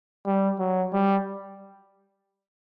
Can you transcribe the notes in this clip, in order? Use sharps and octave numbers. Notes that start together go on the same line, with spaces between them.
G3
F#3
G3